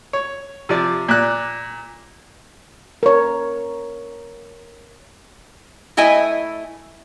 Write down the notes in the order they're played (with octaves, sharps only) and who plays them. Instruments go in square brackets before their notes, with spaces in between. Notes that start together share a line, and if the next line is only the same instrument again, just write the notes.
[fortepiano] C#5
C3 F3 D5
A#2 D5 F#6
[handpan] A#4 C#5
[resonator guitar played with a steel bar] A3 E4 D#5 E5 G#5